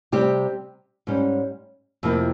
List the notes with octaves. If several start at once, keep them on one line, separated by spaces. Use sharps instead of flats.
C3 G3 C4 G4
G#2 G3 C#4
F2 C3 F3 A#3 E4